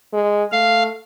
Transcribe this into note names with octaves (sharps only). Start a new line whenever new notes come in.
G#3
A3 F5